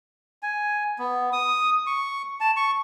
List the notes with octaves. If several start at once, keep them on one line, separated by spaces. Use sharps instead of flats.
G#5
B3
D#6
C#6
A5
C#6